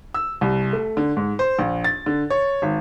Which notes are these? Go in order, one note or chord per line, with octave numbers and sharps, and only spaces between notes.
E6
C2
A3
D3
G#2
C5
A#1
A6
D3
C#5
G#1